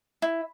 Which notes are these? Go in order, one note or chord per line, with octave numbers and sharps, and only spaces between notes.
E4